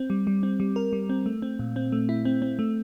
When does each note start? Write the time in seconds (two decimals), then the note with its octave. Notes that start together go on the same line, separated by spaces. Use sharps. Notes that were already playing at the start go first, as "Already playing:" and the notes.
Already playing: C4
0.10 G3
0.27 G3
0.43 C4
0.60 G3
0.76 A#4
0.93 G3
1.09 C4
1.26 A3
1.42 C4
1.59 A#2
1.76 C4
1.92 A3
2.09 E4
2.25 C4
2.42 C4
2.59 A3